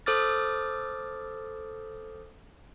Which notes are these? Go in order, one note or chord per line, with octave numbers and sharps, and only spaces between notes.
A4 C5 D6 D#6 F6 A6